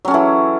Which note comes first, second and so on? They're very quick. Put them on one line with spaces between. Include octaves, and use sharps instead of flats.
F#3 C#4 A4 E3